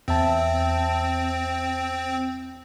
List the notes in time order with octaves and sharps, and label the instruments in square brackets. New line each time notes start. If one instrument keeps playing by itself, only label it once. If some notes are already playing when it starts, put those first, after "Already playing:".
[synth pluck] E2 E5 A5 [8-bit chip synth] C4